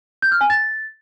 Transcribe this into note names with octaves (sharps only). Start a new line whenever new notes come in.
G6
F6
G#5
A6